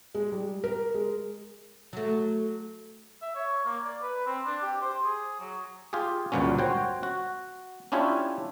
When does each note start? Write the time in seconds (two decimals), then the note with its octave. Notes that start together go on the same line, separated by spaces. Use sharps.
0.15 G#3
0.32 G3
0.64 A#4
0.95 G#3
1.93 F#3 A3
3.22 E5
3.35 C#5
3.65 A#3
3.84 D5
4.02 B4
4.26 C4
4.45 D4
4.62 G4
4.81 C5
5.04 G#4
5.40 F#3
5.93 F4 G4 G#4
6.32 G1 C#2 G2 A#2 F#3 C#4
6.58 F#4 C5 C#5 G5
7.03 F#4
7.92 C#4 D4 E4 F4 G4 C#5